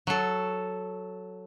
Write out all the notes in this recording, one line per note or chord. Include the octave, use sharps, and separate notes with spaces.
F#3 A4